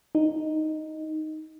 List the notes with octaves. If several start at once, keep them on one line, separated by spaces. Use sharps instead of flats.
D#4